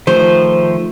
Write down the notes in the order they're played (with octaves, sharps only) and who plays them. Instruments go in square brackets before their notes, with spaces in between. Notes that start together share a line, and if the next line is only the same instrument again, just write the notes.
[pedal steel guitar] D#3 F3 A3 [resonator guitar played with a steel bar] C5